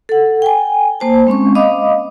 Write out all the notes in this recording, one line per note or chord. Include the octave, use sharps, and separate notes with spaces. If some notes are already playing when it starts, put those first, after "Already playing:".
A4 F#5
G5 G#5
A#3 C5 A5
G#3 C4 C#4 C#6
D#5 F5 B5 D6 D#6